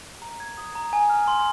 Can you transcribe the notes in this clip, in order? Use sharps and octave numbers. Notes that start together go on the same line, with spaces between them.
A#5
G#6
D#6
A#5
G#5
F6
C6